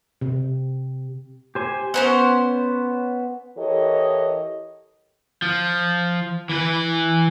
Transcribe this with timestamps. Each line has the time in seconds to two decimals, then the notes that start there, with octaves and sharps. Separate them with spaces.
0.21 C3
1.55 G4 C5 G#5
1.94 B3 C#4 C5 F#5
3.57 E3 G4 A4 A#4 C#5 D#5
5.42 F3
6.49 E3 B4